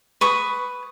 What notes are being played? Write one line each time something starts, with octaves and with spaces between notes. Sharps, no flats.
B4 C#6 D#6